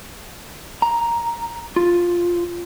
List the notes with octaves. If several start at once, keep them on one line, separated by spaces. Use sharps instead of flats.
A#5
F4